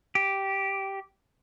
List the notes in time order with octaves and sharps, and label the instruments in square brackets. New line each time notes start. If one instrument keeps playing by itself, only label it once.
[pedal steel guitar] G4